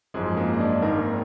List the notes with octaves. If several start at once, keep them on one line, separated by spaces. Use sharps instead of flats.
G#1 F#2 F3 G#3 G#4
A#3 A#4
D#5
D4 D5
G#1 G#2 D#3 A#3 A#4
A#4